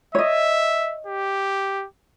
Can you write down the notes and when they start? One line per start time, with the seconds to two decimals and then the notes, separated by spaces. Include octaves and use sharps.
0.15 C#5 D#5 E5
1.07 G4